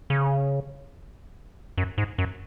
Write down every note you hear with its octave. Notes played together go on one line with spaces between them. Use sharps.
C#3
F#2
G#2
F#2